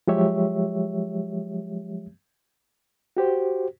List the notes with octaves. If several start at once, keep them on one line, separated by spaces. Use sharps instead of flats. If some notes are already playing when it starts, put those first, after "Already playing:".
F3 F#3 G#3 G4 C#5 E5
F#4 G4 C5